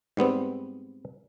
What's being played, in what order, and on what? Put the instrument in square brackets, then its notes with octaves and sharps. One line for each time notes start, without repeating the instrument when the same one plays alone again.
[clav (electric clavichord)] G#2 G3 B3 C4